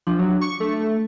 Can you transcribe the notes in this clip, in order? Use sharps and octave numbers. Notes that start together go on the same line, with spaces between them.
F3 D4
F#3
C#6
A3